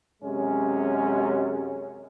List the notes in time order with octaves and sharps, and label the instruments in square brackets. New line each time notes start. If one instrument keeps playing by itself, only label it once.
[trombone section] F#2 C3 G#3 C#4